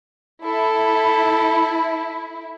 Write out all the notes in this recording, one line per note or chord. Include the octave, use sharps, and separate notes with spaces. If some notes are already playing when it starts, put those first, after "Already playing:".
E4 A4 B5